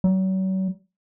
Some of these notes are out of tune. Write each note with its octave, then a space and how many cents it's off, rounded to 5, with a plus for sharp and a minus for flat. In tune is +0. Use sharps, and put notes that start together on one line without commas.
F#3 +40